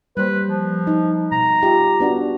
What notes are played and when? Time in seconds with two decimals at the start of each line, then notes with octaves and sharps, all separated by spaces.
0.17 G3 A#3 B4 C5
0.49 F3
0.87 D#4
1.32 B2 A#5
1.63 F4 G4 E5
2.00 B3 D4 F#4